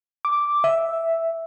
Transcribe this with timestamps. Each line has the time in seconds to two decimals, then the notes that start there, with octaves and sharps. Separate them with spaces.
0.25 D6
0.64 E5